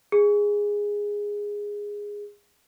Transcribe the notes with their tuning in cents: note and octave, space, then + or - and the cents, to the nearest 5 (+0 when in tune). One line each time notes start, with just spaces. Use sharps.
G#4 -10